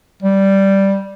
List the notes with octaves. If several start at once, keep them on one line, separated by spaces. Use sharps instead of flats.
G3